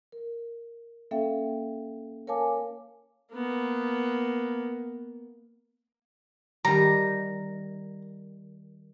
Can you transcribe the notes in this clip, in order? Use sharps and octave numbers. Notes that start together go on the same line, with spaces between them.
A#4
A#3 C#4 A4 E5 F5 G5
A#4 C#5 F5 G#5 A5 D6
A#3 B3
D#3 G3 A#5